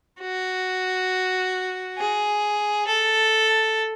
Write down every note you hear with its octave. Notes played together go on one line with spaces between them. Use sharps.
F#4
G#4
A4